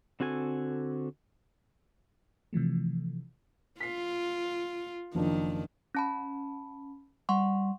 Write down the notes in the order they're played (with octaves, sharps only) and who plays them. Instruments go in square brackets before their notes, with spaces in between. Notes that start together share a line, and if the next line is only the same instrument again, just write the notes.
[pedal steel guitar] D3 C4 F#4 A4 G#5
[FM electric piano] C3 E3 F3 A3
[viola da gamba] F4 [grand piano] B6 C7
[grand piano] F#1 F3 D4 [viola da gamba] D#3
[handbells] C#4 A5 B5
[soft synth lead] G3 [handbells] F#5 C6 C#6